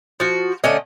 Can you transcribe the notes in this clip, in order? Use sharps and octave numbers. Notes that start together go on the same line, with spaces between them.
F3 F#4
D3 A3 C#4 D#5